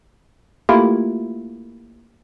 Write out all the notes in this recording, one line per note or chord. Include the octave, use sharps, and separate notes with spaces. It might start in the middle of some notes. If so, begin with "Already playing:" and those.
A3 A#3 E4 F4 G4 A#4